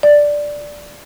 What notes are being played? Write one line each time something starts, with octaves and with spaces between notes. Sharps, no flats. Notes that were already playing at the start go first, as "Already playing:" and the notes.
D5